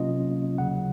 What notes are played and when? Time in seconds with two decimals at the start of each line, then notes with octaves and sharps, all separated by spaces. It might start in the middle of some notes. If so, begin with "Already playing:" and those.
Already playing: C3 F#3 A#3 C#4 F4 D#5
0.58 D#2 C#3 F#3 F#5